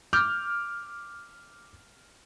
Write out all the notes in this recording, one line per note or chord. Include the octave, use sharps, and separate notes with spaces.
D6 F6 G6